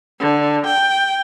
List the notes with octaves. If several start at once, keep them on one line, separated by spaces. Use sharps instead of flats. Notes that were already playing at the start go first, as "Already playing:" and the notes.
D3
G5